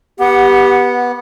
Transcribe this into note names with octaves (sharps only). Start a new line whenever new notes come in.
B3 G4 F#5